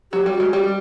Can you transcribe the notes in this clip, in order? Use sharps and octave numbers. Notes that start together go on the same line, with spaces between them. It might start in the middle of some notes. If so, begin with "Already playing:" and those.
F#3 G4
G3
F#4
G#3
G3 G4